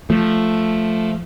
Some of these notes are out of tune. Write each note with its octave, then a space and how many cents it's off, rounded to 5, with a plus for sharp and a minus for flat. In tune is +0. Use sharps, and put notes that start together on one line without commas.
F3 +0 A3 +0